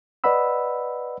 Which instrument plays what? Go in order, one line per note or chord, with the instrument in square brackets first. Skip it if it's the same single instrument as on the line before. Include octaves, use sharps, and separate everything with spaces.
[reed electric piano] B4 D5 D#5 F#5 B5 E6